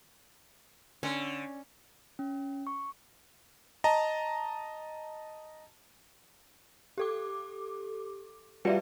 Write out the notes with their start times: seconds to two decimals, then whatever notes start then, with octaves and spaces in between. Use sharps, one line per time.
1.03 D3 C#4
2.19 C#4
2.67 C#6
3.84 D#5 A5 A#5
6.98 G4 A4 D6
8.65 G3 F4 F#4 B4 D5 E5